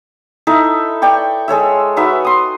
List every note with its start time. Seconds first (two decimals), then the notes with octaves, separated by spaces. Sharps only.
0.47 D#4 E4 A4 E5
1.02 D5 G5 C#6
1.48 G#3 A4 C#5 E5
1.96 D#4 F#4 B4 E5
2.25 C6 D#6